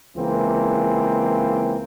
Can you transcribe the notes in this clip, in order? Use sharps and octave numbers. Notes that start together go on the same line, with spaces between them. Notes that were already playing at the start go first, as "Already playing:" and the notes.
C#2 E3 A#3 C4